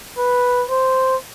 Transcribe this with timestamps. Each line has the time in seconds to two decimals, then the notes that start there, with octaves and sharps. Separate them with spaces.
0.18 B4
0.69 C5